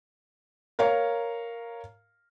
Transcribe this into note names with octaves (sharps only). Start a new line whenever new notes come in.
A#4 C#5 F5 A#5